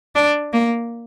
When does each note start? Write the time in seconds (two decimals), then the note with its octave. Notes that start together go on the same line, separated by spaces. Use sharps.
0.15 D4
0.53 A#3